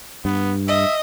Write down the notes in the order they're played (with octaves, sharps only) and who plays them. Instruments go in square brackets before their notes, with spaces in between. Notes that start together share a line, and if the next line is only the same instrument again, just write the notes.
[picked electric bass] G2 [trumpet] B3
[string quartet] D#5 [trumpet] E5